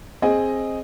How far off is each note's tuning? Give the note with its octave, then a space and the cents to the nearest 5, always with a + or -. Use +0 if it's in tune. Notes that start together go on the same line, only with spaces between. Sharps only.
C4 +15 G#4 +0 D#5 +0